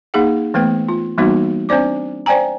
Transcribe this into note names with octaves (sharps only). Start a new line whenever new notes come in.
A#3 D#4 G#4 F#5
E3 A3 B3 B4 G5
F4
E3 G3 A#3 B3 D#4 F#4
C4 D4 C5 D5 D6
C5 D5 G5 G#5 A#5